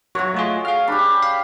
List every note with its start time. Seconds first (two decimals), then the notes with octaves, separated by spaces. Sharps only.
0.15 F#3 F#4 C#5
0.34 A3 F4 G#4 D#5
0.65 G#4 F5 F6
0.88 D4 G4 B5
1.22 F5